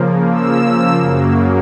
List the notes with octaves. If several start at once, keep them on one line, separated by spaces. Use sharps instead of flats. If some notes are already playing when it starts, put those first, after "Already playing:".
Already playing: C#3 F3 A#3
E6
F#2 C#3 F#3 A#3